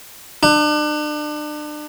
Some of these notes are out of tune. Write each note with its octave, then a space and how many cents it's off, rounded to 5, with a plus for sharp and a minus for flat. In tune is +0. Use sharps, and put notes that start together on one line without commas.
D4 +35